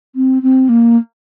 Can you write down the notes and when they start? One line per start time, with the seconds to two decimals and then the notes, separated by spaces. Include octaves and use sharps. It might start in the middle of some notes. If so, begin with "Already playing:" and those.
0.16 C4
0.43 C4
0.69 A#3